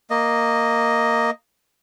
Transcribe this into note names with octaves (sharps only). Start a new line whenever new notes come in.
A#3 D#5